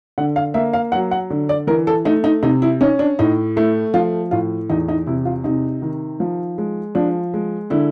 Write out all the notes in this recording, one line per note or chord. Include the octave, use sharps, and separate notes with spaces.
D3 F#5
F5
A#3 E5
F5
F#3 F#5
F#5
D3
D5
E3 A#4
A4
A3 D#4
D#4
C3 D#4
E4
C#4 D#4
D4
A2 D#4
A3 E4
F3 F4
A2 F4
E2 D#4
D#4
C3 E4
F4
C3 D#4
D#3
F3
G#3
F3 D4
G#3
D3 E4